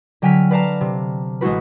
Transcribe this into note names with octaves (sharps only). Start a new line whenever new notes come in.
D3 F#3 G5 G#5 F6 B6
B4 D5 F5 A5 A#5
C3
A1 G#3 E4 F#4 B4